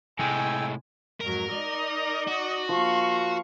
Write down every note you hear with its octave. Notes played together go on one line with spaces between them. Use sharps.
A2 C3 G#3 G5 G#5 E6
F2 G#2 F#3 A#4
D#4 D5 D#5
F#4
F3 A#3 F5 C#6